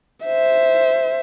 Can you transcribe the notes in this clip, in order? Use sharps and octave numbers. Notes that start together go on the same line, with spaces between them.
C5 E5